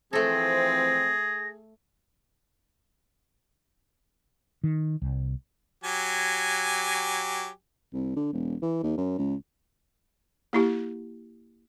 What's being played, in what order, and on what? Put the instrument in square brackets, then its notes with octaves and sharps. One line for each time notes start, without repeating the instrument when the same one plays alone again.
[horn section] E3 F3 C4 [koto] A3 A4 [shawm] G#4 [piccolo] A#6
[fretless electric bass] D#3
C2
[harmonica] F#3 G4 G#5
[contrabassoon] C2
D3
E1
E3
D#2
F#2
C#2
[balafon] A#3 E4 G4